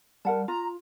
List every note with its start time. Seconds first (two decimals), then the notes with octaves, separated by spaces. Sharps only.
0.25 G3 A#4 F#5 A5
0.48 F4 A#5